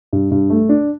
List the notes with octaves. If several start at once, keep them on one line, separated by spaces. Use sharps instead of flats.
G2
G2
A3
D4